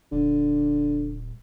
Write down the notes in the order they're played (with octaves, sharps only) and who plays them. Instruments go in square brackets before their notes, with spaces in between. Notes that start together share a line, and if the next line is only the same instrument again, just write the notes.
[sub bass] D#1 [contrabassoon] D3